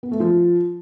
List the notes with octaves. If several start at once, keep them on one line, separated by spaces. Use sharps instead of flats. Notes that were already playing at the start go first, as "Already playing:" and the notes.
B3
A3
F3